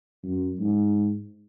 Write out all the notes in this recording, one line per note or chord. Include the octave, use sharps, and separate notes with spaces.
F#2
G#2